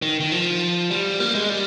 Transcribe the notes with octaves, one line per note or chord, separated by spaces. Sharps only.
D#3
D#3
F3
G3
A#3
G#3
G3